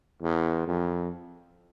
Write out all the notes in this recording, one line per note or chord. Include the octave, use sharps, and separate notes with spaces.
E2
F2